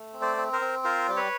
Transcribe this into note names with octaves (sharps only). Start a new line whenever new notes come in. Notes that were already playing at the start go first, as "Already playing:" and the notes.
Already playing: A3
C4
C5 D5
C4
A#4 C5
C4
F4 A#4 C5
G3
B4 C#5